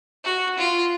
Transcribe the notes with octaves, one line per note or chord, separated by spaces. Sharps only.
F#4
F4